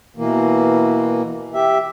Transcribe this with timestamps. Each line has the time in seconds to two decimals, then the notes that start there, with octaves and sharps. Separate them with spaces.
0.17 B2 E3 A#3
1.54 G4 E5